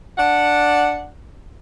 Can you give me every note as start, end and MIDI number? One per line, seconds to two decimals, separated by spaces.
0.18 1.07 62
0.18 1.07 74
0.18 1.07 78